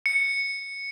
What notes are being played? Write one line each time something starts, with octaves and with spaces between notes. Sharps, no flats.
C#7